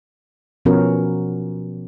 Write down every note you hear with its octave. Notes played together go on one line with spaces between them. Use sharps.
B2 F3 B3 C#4 F#4 A#4